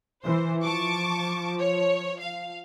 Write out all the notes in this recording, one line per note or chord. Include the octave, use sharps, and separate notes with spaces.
E3 C5
F3 A5 C#6 D6
C#5
F5